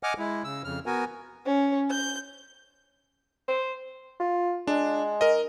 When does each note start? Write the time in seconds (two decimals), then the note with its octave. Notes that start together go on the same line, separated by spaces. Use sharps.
0.03 D#5 F#5 G#5 D6 F6
0.18 G#3 E4
0.44 C#3 E6
0.64 F2 C#3 F6
0.86 B3 F#4 A#4 G#5
1.46 C#4
1.90 G6
3.48 C5
4.20 F4
4.67 G#3 D4
5.21 A#4 D#5